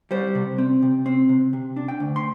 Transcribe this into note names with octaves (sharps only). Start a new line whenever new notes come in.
G3 C5
C3
C4
C3
C4
C3
C3
D4
G5
D2
C6